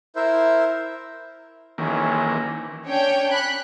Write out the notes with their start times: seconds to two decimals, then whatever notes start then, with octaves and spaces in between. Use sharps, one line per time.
0.16 E4 A#4 C5 E5
1.78 B1 C3 D#3 E3 A#3 C#4
2.86 C#4 D4 C#5 G5
3.31 B5 F#6